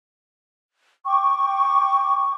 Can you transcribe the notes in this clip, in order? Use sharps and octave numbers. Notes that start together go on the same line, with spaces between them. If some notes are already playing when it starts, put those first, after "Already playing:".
G5 C#6 D6